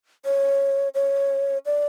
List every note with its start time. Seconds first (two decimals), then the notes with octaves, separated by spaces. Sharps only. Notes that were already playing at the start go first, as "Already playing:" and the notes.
0.25 C#5
0.95 C#5
1.66 D5